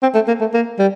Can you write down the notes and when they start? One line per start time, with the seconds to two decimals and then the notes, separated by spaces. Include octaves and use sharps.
0.03 C4
0.15 A3
0.28 A#3
0.41 A3
0.54 A#3
0.79 G3